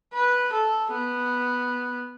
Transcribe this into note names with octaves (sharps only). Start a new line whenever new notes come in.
B4
A4
B3